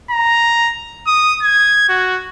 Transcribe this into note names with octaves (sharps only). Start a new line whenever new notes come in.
A#5
D#6
G#6
F#4